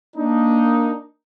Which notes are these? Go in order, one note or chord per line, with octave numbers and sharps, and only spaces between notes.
A#3 D4 D#4